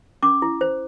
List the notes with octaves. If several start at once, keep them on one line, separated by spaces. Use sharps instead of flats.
C#4 D6
E4
C5